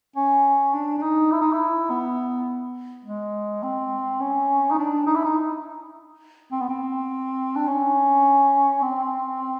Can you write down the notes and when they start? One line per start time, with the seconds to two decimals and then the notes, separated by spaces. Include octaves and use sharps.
0.16 C#4
0.74 D4
0.98 D4
1.02 D#4
1.32 E4
1.41 D#4
1.53 E4
1.90 B3
3.04 G#3
3.63 C4
4.20 C#4
4.71 D#4
4.78 D4
5.07 D#4
5.15 E4
5.24 D#4
6.52 C4
6.60 B3
6.69 C4
7.56 D4
7.67 C#4
8.82 C4